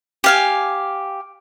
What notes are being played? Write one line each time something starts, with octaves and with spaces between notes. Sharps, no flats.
G4 F5 G#5